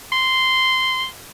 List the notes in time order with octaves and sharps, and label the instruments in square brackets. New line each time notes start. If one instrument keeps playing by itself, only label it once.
[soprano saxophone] C6